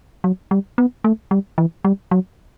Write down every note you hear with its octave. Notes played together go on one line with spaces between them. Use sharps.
F#3
G3
B3
A3
G3
E3
G3
F#3